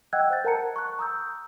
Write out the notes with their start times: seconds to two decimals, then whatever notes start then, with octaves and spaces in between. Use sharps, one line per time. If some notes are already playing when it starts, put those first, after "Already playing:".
0.13 D#5 F#5 G5 E6 F#6 G#6
0.30 C5 F5 F#6 G6 A6
0.44 A#4 F#5 A5 A#5 C#7
0.76 C#6 F#6
0.99 A#5 D#6 E6 G6